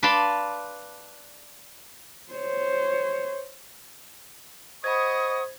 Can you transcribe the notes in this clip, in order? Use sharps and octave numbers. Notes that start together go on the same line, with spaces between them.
B4 D5 F5 A5 B5 C6
C5 C#5
C5 D#5 F#5 B5 C#6 D#6 G#6